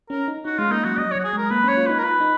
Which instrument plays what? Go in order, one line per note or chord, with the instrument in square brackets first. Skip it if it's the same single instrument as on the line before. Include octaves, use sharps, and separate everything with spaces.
[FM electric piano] C#4 [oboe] A#4
[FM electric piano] D#4
[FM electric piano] D#4 [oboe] F#4
[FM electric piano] G#3 [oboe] F4
[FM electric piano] A#3 [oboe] D#4
[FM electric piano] F#3 [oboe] F#4
[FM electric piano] F#3 [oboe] D#5
[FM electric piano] F#3 [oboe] C#5
[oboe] F#4
G#4
[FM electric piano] G#3
[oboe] A#4
[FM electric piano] A#3 [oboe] B4
[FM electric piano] C#4
[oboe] C#5
[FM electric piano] F4
[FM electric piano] D#4 [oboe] B4
[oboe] A#4
[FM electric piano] F4 [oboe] B4
[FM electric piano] D#4